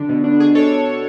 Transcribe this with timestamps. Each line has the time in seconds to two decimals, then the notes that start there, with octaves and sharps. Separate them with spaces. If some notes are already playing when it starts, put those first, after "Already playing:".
Already playing: D3
0.09 B2
0.24 D4
0.40 B2 G#4
0.55 D4 A4 C#5